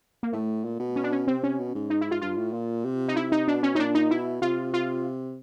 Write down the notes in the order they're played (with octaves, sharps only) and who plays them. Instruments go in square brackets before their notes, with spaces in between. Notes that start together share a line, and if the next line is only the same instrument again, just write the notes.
[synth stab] A#3
[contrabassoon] A2 [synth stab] A3
[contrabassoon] A#2
B2
[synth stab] C#4
D4
C#4
[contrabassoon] C3 [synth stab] C4
[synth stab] C#4
[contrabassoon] B2
G#2
[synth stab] D#4
E4
F4
[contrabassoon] G2 [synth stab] F4
[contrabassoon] A2
A#2
C3
[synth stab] D#4
[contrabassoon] C3 [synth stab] E4
[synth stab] D#4
[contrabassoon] B2 [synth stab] D4
[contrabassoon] B2 [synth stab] C#4
[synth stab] D#4
[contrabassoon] A#2 [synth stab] D4
[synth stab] D#4
[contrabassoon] B2 [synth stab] E4
[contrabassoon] C3 [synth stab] F4
[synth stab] F4